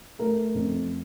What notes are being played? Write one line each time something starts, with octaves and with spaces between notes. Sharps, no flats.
A3 A#4
F2